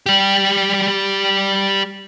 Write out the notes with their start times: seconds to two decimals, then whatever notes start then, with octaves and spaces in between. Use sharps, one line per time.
0.06 G3 G4